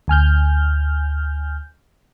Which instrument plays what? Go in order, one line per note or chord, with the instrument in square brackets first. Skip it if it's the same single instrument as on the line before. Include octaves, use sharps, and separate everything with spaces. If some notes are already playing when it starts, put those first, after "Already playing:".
[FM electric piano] D2 G#5 F6 G6